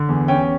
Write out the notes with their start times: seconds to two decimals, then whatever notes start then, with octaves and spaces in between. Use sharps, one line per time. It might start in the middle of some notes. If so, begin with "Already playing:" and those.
Already playing: D3
0.09 E2
0.28 C#4 G5